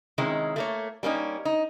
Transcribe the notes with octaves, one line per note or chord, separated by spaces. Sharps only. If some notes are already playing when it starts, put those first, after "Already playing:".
C3 D#3 G#3 C#4 E4
A3 A#3 C#5
G3 A#3 C#4 D#4
D#4